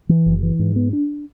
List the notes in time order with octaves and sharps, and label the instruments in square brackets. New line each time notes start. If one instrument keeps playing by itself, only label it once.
[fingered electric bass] E3
F#1
E3
G#2
B3
D4